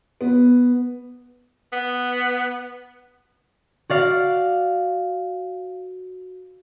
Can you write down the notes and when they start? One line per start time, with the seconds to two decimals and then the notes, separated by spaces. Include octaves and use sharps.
0.21 B3
1.73 B3
3.90 F#4 D5 F5